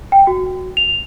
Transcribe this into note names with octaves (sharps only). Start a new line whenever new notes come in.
G5
F#4
F7